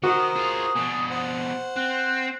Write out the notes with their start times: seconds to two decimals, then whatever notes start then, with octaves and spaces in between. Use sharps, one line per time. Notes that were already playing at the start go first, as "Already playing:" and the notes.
0.03 D#3 F#4 A#4 C5 D#6
0.36 F4 G#4
0.75 B2 D4 G#5
1.10 C5 F#5
1.77 C4 F#6